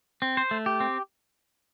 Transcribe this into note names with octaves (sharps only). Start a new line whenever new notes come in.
C4
C5
A3
G4
C4